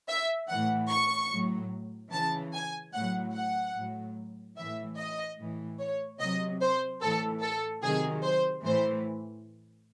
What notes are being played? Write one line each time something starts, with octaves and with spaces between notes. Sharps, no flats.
E5
A2 E3 F#5
C#6
A2 F#3
C#3 E3 A5
G#5
A2 F#3 F#5
F#5
A2 F#3
A2 E3 E5
D#5
A2 E3
C#5
C3 F#3 D#5
C5
A2 E3 A4
A4
C3 D#3 F#3 G#4
C5
A2 E3 C5